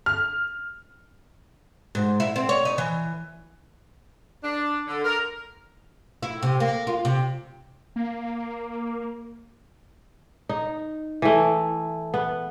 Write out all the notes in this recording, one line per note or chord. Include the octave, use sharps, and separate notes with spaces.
F6
G#2
E4
C4
C#5
D#4
E3
D4
D3
A#4
E4
C3
A#3
F4
C3
A#3
D#4
E3 A3
B3